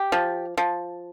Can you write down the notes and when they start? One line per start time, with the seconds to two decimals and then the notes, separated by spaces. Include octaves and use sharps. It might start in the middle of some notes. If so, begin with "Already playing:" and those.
Already playing: G4
0.12 F3
0.58 F3